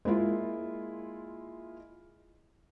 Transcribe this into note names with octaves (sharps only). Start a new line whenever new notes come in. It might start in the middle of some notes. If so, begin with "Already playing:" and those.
G#3 A#3 E4 F4